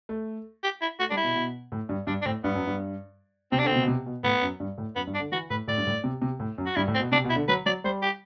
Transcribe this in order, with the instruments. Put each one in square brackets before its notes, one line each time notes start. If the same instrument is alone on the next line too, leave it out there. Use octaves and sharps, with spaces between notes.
[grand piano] A3
[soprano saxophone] G4
E4
[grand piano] A3 [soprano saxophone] F#4
[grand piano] G3 [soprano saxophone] D4
[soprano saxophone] E4
[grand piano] B2
B2
A2
G2
[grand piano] G2 [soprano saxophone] D4
[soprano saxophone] D4
[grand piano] A2 [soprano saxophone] C4
[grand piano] G2 [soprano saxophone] B3
[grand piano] F#2
G2
[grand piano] C3 [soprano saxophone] C4
[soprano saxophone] D4
[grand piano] D3
[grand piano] B2 [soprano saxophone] C4
[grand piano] C3
B2
C3
B2
[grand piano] A2 [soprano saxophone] B3
[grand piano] F#2
G2
A2
[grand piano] F#2 [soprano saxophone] B3
[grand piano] G2
[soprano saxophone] D4
[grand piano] D3
[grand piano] E3 [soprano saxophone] F#4
[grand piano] A2 [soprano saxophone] B4
[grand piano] A2 [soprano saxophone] D5
[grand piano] G2
A2
C3
C3
A2
F#2
[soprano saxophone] F#4
[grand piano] G2 [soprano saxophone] E4
[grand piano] A2
[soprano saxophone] C4
[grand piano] B2
[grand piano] C3 [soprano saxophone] D4
[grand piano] B2
[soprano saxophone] E4
[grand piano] D3
[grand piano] F#3 [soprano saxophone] B4
[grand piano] F#3 [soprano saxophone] D5
[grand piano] G3 [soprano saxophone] C5
[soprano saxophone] G4